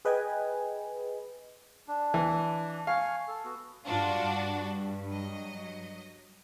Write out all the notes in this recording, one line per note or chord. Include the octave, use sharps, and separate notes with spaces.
G#4 B4 D#5 G5 G#5
D4
E3
F5 G#5 C#6
A4
B3 F#4
G2 D4 F4 F#4
G2
F#3 D#5